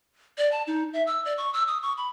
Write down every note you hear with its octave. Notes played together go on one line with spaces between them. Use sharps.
D5
A5
D#4
E5
E6
D5
C#6
E6
D#6
C#6
B5